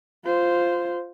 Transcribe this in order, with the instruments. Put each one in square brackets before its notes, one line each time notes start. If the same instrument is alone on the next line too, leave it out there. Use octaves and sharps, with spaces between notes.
[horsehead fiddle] F4 C5